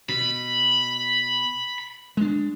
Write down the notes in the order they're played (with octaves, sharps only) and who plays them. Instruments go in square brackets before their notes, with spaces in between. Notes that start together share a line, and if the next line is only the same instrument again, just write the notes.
[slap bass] B2 [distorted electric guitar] B5
[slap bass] G#3 D4